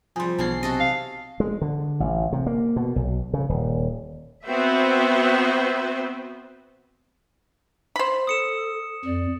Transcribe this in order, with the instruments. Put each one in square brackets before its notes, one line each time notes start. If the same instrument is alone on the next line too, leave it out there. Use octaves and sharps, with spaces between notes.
[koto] C3 G3 [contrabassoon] F3 [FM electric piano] G#4 C5
[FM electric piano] B1 G#4 C7 [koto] D3 E3 C#4
[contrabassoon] C3 [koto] F#4 A4 D#5
[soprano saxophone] F5
[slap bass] G#3
D3
A1
C3
A#3
B2
B1
C#3
D#1
[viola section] B3 C4 F#4 B4 C5 E5
[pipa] C5 B5
[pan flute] A4 [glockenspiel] D#6 C#7 E7
[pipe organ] F2 [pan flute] D5